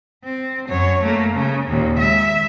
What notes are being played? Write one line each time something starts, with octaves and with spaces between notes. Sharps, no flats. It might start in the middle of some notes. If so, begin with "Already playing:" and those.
C4
F#2 C#5
A3 A#3
C#3
D#2 A#2
G#3 E5